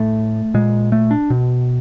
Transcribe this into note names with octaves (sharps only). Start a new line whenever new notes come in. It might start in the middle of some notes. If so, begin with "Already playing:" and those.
Already playing: A2 A3
A#2 G#3
A3
D4
B2